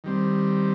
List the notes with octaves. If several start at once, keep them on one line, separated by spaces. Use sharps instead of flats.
D#3 G3 C4